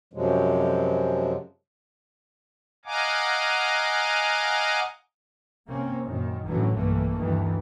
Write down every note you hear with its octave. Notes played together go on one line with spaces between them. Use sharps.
F#2 C3 F3 F#3 G#3
D#5 F5 F#5 G#5 A#5 D6
C3 A#3 C4 C#4
F#2 A#2 D#3
F#1 A2 D3 E3 F#3 C#4
B1 G2 E3 A3 A#3
D2 G2 D#3 E3